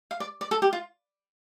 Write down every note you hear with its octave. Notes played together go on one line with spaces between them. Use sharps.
F5
D5
D5
A4
G4
F4